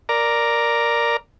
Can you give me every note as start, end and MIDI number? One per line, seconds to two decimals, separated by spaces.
0.09 1.17 70
0.09 1.17 74
0.09 1.17 82